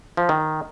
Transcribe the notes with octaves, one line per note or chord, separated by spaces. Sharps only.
F3
D#3